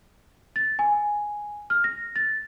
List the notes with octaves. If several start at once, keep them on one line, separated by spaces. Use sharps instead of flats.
A6
G#5
F6
A#6
A6